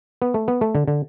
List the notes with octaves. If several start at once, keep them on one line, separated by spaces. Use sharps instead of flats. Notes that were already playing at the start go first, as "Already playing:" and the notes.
B3
A3
B3
A3
D3
D3